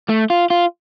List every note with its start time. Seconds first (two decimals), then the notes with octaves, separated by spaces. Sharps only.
0.09 A3
0.30 F4
0.50 F4